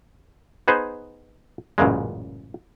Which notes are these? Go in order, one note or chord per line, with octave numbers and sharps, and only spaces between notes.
B3 D#4 G#4 B4 C5
A1 F#2 A#2 C#3 G#3